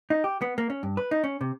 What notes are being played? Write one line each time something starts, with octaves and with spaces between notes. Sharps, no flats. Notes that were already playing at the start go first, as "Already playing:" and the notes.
D#4
G4
B3
A#3
C#4
G2
B4
D#4
C#4
C3